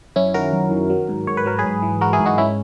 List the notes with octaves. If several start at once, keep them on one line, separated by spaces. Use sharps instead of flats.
F#2 C#4 E4
D#3 F#4 A#4
F#2
D#3
F#3
G#2
G#2 C#5
B4
F#3 A#4
G#4 B4
G#2
E3
G#3 F#4 A#4
E4 G#4
G#2
D#4 F#4
G#3 C#4 E4